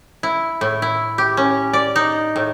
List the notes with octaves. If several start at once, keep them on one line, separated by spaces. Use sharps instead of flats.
E4
A2
E4
G4
C#4
D5
D#4
A2